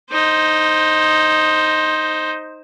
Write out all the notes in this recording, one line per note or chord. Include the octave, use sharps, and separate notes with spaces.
D#4 C5